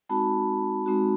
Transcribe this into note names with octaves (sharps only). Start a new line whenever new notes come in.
G#3 C4 D#4 F#4 A5 B5
G#3 C4 D#4 F#4